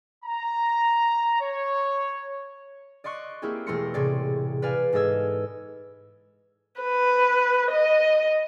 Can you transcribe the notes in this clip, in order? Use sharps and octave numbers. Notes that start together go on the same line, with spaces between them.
A#5
C#5
D5 D#5 C6 C#6 F#6
A#3 C4 E4 G4 G#4
E1 A3 C4 C6 A#6 C#7
A2 C3 G#4 D5
B4 D5 F5 G#5
G#2 G#3 A4 D#5 E6 G#6
B4
D#5